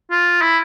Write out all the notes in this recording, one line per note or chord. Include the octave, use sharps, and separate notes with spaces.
F4
E4